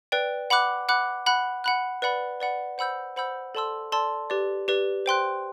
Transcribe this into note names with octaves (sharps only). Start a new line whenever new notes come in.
B4 D5 G5
F#5 B5 D6 F#6
F#5 B5 D6 F#6
F#5 B5 F#6
F#5 B5 F#6
B4 D5 F#5 B5
B4 D5 F#5 B5
C5 F#5 B5 E6 G6
C5 F#5 B5 E6 G6
A4 D5 A5 C6 E6
A4 D5 A5 C6 E6
G4 B4 D5
G4 B4 D5
C5 G5 C6 F#6